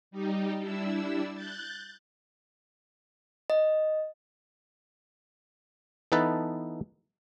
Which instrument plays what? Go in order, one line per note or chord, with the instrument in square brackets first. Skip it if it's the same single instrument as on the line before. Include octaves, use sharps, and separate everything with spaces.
[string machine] G3 D#4 G4
G3 D4 E4 E6
F#6 G6 A6
[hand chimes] D#5
[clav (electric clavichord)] E3 B3 D#4 A4 B4 A5